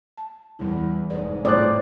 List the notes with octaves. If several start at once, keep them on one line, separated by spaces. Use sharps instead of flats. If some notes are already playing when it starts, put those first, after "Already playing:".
A5
E2 G3 E4
F1 G#2 G#4 B4 D5
A2 C4 F4 G#4 D5 D#6 F#6